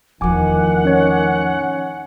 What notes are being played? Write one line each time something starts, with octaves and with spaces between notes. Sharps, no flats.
E2 A2 D#3 F3 F#5 G#5 D6
C#4 C#5